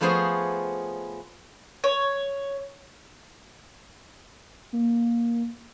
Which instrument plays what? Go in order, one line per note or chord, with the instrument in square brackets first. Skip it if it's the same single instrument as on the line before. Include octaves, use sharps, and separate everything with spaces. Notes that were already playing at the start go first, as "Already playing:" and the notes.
[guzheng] F3 A3 B3 G#4 C5 C#5
[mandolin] C#5
[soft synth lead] A#3